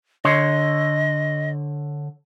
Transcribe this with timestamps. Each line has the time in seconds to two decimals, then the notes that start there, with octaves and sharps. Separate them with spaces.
0.25 D3 C#5 D#5 C6